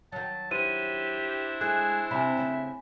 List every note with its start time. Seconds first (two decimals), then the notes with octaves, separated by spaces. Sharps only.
0.12 D#3 F#3 A5
0.51 D4 E4 G4 C5 D#7
1.61 G#3 A3 G#4 F#6
2.11 C3 E5 G#5 B5
2.37 C#3 A3